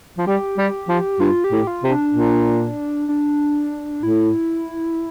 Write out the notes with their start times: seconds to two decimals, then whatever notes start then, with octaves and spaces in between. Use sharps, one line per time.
0.18 F3
0.27 G3 G4
0.58 G3
0.89 F3
1.20 G2 F4
1.44 G4
1.52 A2
1.67 F4
1.83 C3
1.90 D4
2.15 A#2
3.09 D4
4.02 A2 E4